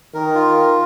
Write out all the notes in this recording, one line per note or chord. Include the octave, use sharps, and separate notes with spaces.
D#3 A#4
F4